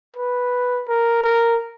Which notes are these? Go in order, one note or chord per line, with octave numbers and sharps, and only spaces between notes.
B4
A#4
A#4